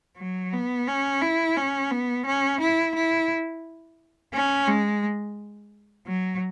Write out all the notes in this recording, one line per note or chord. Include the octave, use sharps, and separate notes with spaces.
F#3
B3
C#4
E4
C#4
B3
C#4
E4
E4
C#4
G#3
F#3